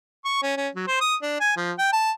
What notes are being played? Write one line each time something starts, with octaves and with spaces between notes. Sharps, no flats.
C#6
C#4
C#4
F#3
C5
D#6
D4
G#5
F3
G5
A5